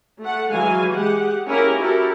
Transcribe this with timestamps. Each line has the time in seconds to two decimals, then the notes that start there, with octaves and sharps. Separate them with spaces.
0.21 A3 F#5
0.52 E3 F#3 G#3 F5 G#5
0.92 G#3 G4 G#4 F#5
1.47 A#3 C#4 E4 G4 G#4 A#4
1.80 E4 F#4 G4 A4 A#4